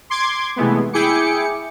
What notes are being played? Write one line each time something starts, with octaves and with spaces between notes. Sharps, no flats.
C6 D6 G#6
C3 E3 G#3 A3 B3
E4 G#4 G5 D6 C#7